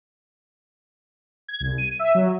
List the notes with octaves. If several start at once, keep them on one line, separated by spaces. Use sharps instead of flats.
G#6
C2
D#7
E5
F#3